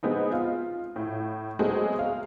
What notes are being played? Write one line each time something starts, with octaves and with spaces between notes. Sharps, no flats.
G#3 B3 C4 D#4
F4
A2
F#3 G#3 A3 B3 C4
F5